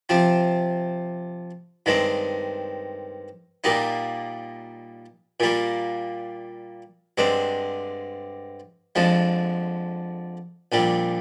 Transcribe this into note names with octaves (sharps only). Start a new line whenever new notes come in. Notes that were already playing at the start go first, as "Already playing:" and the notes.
C3 F3 C4
G2 D#3 G#3 C4
A#2 G3 A#3 D#4
A#2 G3 A#3
G2 D3 G#3 C4
F2 D3 F3 G#3
A#1 A#2 G3